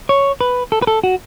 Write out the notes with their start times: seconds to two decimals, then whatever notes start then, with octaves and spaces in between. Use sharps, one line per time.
0.09 C#5
0.41 B4
0.72 A4
0.82 B4
0.87 A4
1.04 F#4